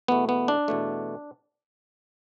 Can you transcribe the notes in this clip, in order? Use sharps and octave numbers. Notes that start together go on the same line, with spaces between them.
E2 B2 A3 B3
B3
D4
E2 B2 A3